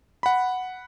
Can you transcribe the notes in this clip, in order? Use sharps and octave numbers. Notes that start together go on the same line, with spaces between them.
F#5 B5